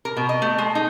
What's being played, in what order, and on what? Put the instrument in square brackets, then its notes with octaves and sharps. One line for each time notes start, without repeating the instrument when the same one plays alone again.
[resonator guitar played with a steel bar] A#4
B2
D#5
A3
G#3
D#4